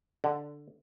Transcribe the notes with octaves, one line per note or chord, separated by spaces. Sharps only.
D3